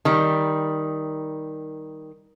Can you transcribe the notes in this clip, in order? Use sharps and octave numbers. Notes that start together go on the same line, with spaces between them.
D#3 G3